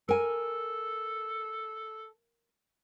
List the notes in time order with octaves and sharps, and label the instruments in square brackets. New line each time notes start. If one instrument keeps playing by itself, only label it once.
[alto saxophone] A4 [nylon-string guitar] A#4 G#5